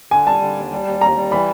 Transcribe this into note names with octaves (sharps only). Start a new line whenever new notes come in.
D3 G#5
G3 A5
D3
D#2
G3
D#2
D#2 A#5
G3
E3 B5